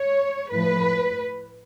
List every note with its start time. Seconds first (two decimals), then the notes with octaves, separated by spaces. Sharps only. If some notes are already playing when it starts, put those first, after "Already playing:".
Already playing: C#5
0.51 A2 F3 B4